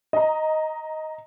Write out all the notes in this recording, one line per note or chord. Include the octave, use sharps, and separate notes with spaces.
D#5 A#5